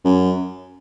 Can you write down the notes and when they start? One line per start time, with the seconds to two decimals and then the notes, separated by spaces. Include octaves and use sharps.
0.05 F#2